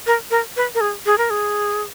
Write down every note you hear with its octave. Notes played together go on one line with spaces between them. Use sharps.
A#4
A#4
B4
A#4
G#4
G#4
A#4
G#4